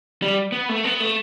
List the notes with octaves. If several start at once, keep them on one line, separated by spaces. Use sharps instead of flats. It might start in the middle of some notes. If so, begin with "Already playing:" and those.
G3
B3
A3
B3
A3